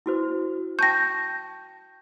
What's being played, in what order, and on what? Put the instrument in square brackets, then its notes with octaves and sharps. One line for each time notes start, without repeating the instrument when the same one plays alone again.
[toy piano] E4 F#4 C5
[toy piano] G5 A5 C#6 [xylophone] G6 A#6